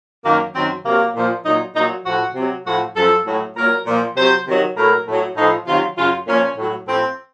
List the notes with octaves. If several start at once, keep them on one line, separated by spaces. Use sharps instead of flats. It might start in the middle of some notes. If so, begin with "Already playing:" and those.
F#2 D#3 F#3 A#3
F#2 D#3 F#3 C4
C3 F#3 A#3
A#2 F3
A#2 F#3 D#4
A#2 F#3 D#4
A2 F3 F#4
C3 F#3
A2 F3 F#4
F#2 F3 A4
A2 F#3
A#2 F#3 A#4
A#2 F3
C3 F#3 C5
C3 D#3 F#3
A2 F#3 A#4
A2 F#3
A2 F3 D#4
C3 D#3 F#3 F4
F#2 C#3 F#3 F4
A#2 F3 C#4
A2 F#3
A2 F3 C4